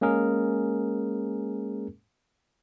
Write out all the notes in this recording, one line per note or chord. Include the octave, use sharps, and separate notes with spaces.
G#3 A#3 C#4 G#4 A#4